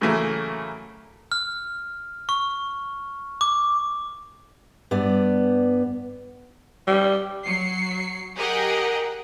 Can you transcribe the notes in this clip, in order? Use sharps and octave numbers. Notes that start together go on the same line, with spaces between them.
A2 C#3 E3 F#3 A3 A#3
F6
C#6
D6
G2 B3 D5
G3
F#3 C7 C#7
G4 G#4 A#4 D#5 F#5 G5